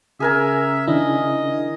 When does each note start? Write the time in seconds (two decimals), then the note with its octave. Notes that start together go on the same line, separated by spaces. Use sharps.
0.20 C#3 G#4 A#4 E5 G#5
0.88 D#3 D4 E4 D#5